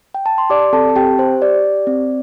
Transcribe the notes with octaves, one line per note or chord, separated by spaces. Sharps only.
G5
A5
C6
G4 D5 D6
C4 A4 A5
A5
C4 G4 G5
G4 C5
G4 D5
G4
C4